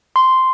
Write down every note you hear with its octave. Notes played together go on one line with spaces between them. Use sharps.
C6